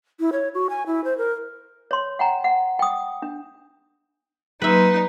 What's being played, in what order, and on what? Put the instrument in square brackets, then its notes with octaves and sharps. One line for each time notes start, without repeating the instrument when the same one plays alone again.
[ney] E4
C#5
F#4
G#5
E4
C5
A#4
[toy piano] C#5 C6
F#5 G5 A#5
F#5
G5 D#6
D4
[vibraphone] F#3 A#3 C6 [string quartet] D#4 [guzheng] B4 E5